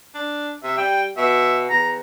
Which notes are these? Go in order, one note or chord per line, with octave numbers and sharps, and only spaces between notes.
D4
C3 E5
G3 G5
B2 E5
E2 A#5